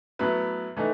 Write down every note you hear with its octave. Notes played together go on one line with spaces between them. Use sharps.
A2 F#3 B3 E4 B4
E3 A3 D#4 A4